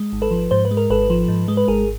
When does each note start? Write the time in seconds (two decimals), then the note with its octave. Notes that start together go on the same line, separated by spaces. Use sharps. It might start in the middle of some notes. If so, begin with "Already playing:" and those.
Already playing: G#3
0.13 G#1
0.22 A4 B4
0.31 F3
0.51 G#2 C5
0.65 B4
0.71 G#3
0.77 A#4
0.90 G#1 A4 B4
1.10 F3
1.28 G#2
1.48 G#3
1.57 B4
1.68 G#1 G#4 A#4